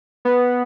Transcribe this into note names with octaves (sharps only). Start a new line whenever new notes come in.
B3